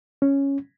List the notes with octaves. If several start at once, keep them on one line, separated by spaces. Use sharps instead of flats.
C#4